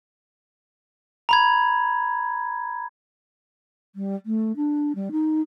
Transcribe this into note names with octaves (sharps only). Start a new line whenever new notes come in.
A#5 B5 G#6
G3
A3
D4
G3
D#4